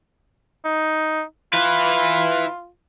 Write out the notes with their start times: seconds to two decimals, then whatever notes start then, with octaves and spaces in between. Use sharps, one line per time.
0.65 D#4
1.53 E4 F4 B4